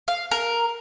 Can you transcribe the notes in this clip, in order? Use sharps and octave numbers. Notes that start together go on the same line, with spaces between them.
F5
A#4